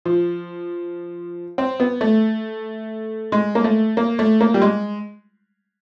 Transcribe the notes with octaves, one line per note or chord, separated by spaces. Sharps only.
F3
C4
B3
A3
G#3
A#3
A3
A#3
A3
A#3
G3
G#3